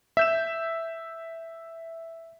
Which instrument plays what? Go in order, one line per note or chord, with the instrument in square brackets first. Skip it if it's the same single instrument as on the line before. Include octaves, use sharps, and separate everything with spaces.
[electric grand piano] E5 G6 E7